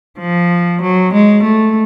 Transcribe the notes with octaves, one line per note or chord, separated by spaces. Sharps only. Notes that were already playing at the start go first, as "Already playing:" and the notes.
F3
F#3
G#3
A3